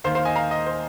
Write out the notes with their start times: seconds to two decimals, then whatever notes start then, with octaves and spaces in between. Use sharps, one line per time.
0.04 D#2 D#3 C5 F5
0.15 C5 F5
0.25 D#5 G#5
0.36 F5 A#5
0.51 D#5
0.67 C5